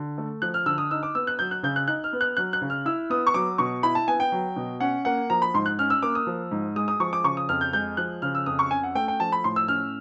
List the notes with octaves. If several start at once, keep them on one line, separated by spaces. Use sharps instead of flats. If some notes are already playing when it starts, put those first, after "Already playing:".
Already playing: D3
A3
F3 F#6
F6
D3 E6
D#6
D#4 E6
D6
B3 E6
F#6
F#3 G6
F#6
C#3 G6
F#6
D#4 F#6
F6
B3
F#6
F#3 F#6
F#6
C#3
F6
E4 E6
B3 D#6
C#6
F#3 D6
B2 C#6
E4 B5
A5
B3 G#5
G5
F#3
B2
C#4 F#5
A#3 F#5
F3 A#5
B5
G#2 C6
F#6
C#4 F6
E6
A#3 D6
D#6
F3
G#2
G#3 D#6
D#6
F3 C#6
D6
C#3 C#6
D#6
F2 F6
G6
G#3 G6
F3 F#6
C#3 F6
E6
F2 D#6
C#6
C#4 G#5
F#5
A3 G5
G5
F3 A5
B5
A2 C6
E6
C#4 F6